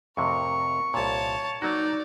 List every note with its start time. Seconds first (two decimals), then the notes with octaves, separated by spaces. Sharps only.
0.17 F2 A2 C3 A#4 C#6
0.94 C2 A#2 C#5 A5
1.62 F#3 A#3 D#4 F#4 D5